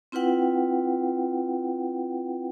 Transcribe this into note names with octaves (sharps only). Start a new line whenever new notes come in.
C4 E4 F4 B4 F#5 G5